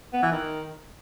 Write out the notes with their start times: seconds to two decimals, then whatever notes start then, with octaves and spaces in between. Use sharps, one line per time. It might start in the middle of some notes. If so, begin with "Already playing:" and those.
0.13 B3
0.23 E3
0.32 D#3